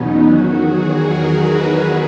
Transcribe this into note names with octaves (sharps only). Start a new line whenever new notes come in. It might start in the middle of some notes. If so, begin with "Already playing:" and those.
Already playing: E2 B2 F#3 B3 C#4 D#4
E2 D#3 F#3 F#4
G#4
A#4
B4